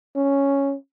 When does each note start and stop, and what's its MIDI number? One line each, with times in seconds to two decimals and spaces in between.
0.16 0.75 61